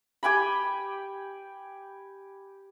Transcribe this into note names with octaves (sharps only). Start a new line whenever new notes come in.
G4 G5 G#5 B5